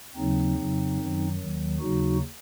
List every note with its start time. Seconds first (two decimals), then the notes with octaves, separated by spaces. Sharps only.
0.16 D#2 C#3 F#3 C4 D#4
0.57 F2 C#3 F#3
0.98 F#2 D#3 F#3
1.39 D#2 D#3 F#3
1.80 D#2 C#3 F#3 D#4 F#4